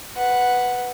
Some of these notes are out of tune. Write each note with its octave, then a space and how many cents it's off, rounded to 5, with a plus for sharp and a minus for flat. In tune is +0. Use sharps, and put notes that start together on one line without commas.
B4 +0 F#5 +0